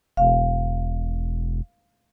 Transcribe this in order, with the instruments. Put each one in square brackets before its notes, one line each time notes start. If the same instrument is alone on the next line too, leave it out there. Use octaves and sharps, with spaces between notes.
[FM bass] E1 [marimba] F5